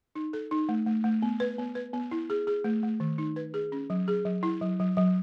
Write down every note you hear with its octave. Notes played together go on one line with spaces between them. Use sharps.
D#4
A4
D#4
A3
A3
A3
B3
B4
B3
B4
B3
E4
G#4
G#4
A3
A3
D#3
D#4
B4
G#4
C#4
F#3
G#4
F#3
E4
F#3
F#3
F#3